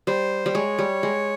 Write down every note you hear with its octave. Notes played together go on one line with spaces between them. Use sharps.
G3 C5
G3
G#3 C#5
G3
G#3